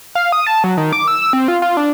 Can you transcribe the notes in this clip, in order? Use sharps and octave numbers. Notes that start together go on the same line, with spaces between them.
F5
D#6
A5
F#3
D#3
D6
E6
E6
C4
F4
F4
D4